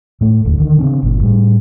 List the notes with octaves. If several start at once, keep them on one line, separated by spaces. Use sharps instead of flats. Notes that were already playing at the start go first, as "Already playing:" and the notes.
A2 A3
E1 D2
D3 D#3
C#3 B3 C4 D4
G1 A#2
A2 G3